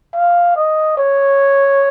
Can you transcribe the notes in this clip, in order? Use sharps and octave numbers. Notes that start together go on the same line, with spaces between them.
F5
D#5
C#5